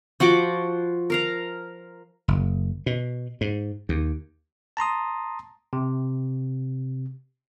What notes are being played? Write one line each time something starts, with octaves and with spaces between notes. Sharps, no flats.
F3 F#4 F#5 D6
A#4 F5 A#5
F#1
B2
G#2
D#2
A5 A#5 C6 D#6
C3